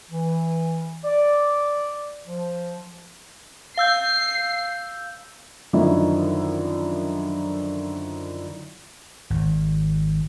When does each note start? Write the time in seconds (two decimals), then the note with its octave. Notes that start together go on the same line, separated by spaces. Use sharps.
0.11 E3
1.05 D5
2.27 F3
3.77 F5 E6 G6 C7
5.73 F#2 D3 D#3 F3 E4
9.30 G#1